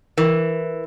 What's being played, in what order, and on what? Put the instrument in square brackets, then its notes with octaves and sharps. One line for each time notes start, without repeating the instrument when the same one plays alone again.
[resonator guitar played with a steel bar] E3 [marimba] A#4